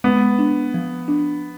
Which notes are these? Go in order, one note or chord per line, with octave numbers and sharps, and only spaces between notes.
G#3 B3
D4
F3
D4